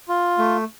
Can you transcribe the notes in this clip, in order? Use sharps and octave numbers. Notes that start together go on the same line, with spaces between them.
F4
A3